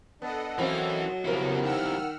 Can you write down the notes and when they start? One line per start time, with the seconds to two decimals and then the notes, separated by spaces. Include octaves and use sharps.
0.22 B3 D4 A4 D#5 F#5
0.59 E3 F#3 A#3 C4 C#4 E4
1.25 F2 C#3 G3 B3 E4 A#4
1.62 D#3 F#5 E6 F6